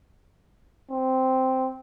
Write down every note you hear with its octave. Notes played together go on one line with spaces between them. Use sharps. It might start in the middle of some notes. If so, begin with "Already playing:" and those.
C4